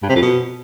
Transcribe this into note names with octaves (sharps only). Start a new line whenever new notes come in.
G2
C3
F2
B2